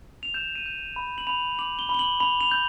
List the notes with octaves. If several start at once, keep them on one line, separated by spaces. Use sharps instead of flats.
F7
G6 E7
D#7
G6
B5
F#7
B5 F7
D6 F#7
G7
B5
G7
F#7
B5 F7
F7
G6